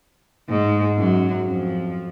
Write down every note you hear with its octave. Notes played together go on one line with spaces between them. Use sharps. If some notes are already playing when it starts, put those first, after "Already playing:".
G#2 G#3
F#2 F#3
F2 F3